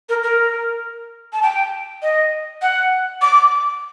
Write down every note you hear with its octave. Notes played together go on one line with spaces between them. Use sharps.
A#4
A#4
A5
G5
D#5
F#5
D6